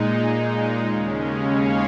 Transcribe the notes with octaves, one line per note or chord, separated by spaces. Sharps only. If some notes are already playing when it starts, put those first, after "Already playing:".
Already playing: A#2 G#3 D#4
D#2 C#3 G#3 C#4 A#4
A#4 D#5
C#5 F5